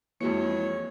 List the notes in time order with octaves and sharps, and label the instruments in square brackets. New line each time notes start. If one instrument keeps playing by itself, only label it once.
[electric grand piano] F2 G#3 C#7 [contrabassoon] E3 [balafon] A#3 F#4 [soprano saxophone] C#5